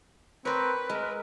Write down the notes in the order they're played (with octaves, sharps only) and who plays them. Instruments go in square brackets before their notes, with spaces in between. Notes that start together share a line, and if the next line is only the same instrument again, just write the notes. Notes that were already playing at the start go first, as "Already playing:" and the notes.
[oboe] C4 [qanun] A#4 C#5 [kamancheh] B4
[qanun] G#3 [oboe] A#4